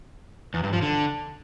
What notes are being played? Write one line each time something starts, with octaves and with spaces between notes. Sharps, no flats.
E2
G2
F3
D3